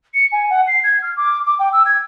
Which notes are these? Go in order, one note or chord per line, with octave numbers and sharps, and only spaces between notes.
C#7
G#5
F#5
C7
G#6
F6
D6
D6
G5
E6
G#6